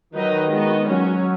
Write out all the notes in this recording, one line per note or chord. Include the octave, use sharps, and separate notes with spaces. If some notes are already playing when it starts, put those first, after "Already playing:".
D#3 F#3 D#4 B4 D#5
G#3 B3 F#4 D#5
F#3 C#4 F#4 C#5